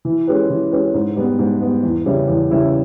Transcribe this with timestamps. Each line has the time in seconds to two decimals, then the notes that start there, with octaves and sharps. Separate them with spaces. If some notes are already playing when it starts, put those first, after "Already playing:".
0.05 E3
0.27 G#3 C#4 G4 B4
0.50 E3
0.72 G#3 C#4 G4 B4
0.94 G#2
1.16 G3 B3
1.39 G#2
1.62 G3 B3
1.83 E2
2.06 C#3 G3 C#4 E4
2.28 E2
2.51 C#3 G3 C#4 E4